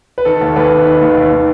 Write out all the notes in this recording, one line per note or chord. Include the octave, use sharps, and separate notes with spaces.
B4
D#3 A4
D#2
D#2 B4
D#3
D#3 B4
D#2
D#2
D#3